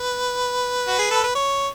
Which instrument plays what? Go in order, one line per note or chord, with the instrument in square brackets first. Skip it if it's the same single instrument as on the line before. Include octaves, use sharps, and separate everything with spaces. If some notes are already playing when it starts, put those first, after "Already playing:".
Already playing: [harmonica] B4
F#4
G#4
A4
B4
C#5